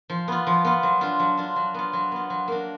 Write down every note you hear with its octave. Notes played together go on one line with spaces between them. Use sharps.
F3
B3 F4
F3
B3 F4
F#3
D4 F4
F#3
D4 F4
F#3
B3 F4
F#3
B3 F4
F#3
A#3 D4